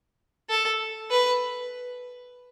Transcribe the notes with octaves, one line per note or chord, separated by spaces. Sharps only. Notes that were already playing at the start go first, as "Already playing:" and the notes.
A4
B4